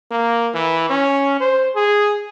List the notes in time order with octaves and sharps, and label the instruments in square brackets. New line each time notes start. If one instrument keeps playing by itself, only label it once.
[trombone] A#3
E3
C#4
C5
G#4